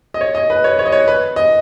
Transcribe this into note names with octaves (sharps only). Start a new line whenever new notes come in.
D#5
C#5
D#5
B4
C#5
C#5
D#5
C#5
B4
D#5